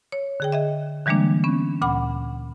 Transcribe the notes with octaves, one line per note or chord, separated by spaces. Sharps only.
C#5
D3 G#4 G5
G#4 D#5 E5
D3 E3 G3 G#3 A#3 D4
B3 C#4
D2 A#2 F#5 B5 D6